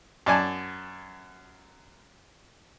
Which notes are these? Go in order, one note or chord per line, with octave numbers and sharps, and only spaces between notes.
F#2 D5 G#5 A5